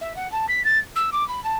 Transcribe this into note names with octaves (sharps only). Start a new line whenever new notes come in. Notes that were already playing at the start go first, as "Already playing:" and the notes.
E5
F#5
A5
B6
A6
E6
D6
B5
A5